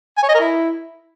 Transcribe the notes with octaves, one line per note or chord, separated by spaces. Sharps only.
G#5
C#5
D#5
A#4
E4